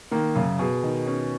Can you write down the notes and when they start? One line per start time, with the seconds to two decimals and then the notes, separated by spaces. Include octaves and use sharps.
0.11 D#3 A#3
0.35 F#2 C#3
0.59 B2 G#4
0.83 D#3
1.06 C#4